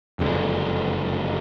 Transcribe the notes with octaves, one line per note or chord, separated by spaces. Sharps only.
F#1 F2 D3 G#3